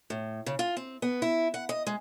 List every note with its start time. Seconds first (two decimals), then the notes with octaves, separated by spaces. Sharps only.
0.10 A2
0.46 C#3
0.59 F4
0.77 C4
1.02 B3
1.22 E4
1.54 F#5
1.69 D#5
1.87 G#3